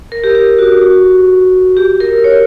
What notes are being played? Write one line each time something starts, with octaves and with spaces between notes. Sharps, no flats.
A#4
G4
G4
F#4
G4
A#4
C#5